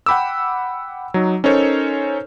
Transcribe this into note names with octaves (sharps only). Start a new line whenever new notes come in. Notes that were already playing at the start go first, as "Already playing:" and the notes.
F#5 G5 B5 D6 E6
F#3 D#4
C#4 D#4 A4 A#4 C5 C#5